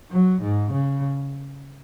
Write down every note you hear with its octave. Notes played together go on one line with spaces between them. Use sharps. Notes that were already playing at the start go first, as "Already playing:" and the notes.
F#3
G#2
C#3